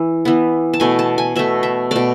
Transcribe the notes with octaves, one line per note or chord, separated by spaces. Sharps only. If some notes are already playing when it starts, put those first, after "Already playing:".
Already playing: E3
E3 B3
A5
B2 A3 G#5
A5
G#5
B2 A3 E5
E5
B2 A3 D5